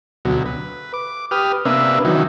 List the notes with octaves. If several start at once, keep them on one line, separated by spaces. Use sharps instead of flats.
D2 B2 F#3
B4
D6
G4 B4 D#6 F6
C3 A#3 B3 D4 B4 E5
D#3 E3 F#3